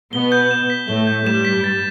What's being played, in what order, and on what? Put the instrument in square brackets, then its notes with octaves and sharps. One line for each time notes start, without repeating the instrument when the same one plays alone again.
[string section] B2 B3 [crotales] G7
[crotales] G6
E7
B6
[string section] A2 A3 [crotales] G7
[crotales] G6
[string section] G2 G3 [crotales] E7
[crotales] B6
A6